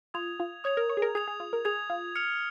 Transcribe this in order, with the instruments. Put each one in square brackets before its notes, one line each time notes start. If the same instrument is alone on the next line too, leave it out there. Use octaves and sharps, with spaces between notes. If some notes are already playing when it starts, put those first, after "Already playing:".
[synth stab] F4 [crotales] D#6 G#6 F7
[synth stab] F4
[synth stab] C#5 [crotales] D#6 G#6 F7
[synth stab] A#4
C#5
G#4
A#4
[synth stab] G#4 [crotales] D#6 G#6 F7
[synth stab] G#4
F4
A#4
[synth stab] G#4 [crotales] D#6 G#6 F7
[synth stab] F4
[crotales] F6 C#7 F7